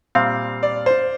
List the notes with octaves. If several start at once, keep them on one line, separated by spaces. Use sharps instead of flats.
A#2 G3 C4 F5
D5
C5